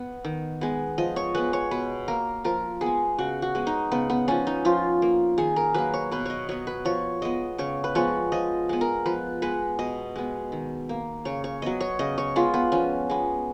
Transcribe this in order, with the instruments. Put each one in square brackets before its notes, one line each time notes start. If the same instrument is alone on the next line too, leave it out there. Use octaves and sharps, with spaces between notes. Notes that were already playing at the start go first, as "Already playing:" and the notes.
Already playing: [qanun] B3
D#3
G#3 B3
F3 D#5
C#5
G#3 B3 B4
C#5
B2 B4
A#3 A#4
F3 A#4
B3 G#4
G#3
C#3 F#4
F#4
G#3 B3
D#4
C#3 B3
B3
F3 B3 C#4
D#4
F3 F4
A#3
D#3 G#4
A#4
F#3 A#3 B4
C#5
B2 B4
C#5 D#5
F#3 B3 C#5
B4
F3 C#5
G#3 B3 D#5
C#3 C#5
B4
F3 G#3 B3 C#5
F3 D#5
G#3 B3
A#4
F3 B4
G#3 B3 B4
B2 D#5
G#3 B3
D#3
A#3
C#3 C#5
C#5
F#3 B3 D#5
C#5
C#3 D#5
C#5
G#3 B3 F4
B3
F3 C#4
G#3 B3